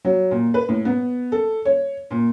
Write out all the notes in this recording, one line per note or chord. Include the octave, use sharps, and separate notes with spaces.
F#3
A#2
B4
A2
B3
A4
C#5
A#2